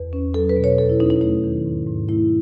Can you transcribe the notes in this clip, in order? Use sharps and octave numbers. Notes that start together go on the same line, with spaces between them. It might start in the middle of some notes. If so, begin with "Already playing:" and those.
Already playing: E2 B4
C#4
F#3 A4
B4
B2
C#5
D#2 A4
E4
C#4 D#4
D#4
A3 D#4
D#3
G#2
G#2
A3 E4